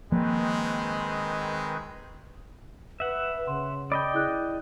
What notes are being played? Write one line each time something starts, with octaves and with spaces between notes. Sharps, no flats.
D#3 F3 G#3 A#3 C4 B4
B4 E5 F#5
C#3 C6
D5 D#5 G5 B5
E4 G#4 F#6